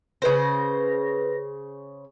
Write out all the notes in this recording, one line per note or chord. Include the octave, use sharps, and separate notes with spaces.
C#3 B4 C5 A#6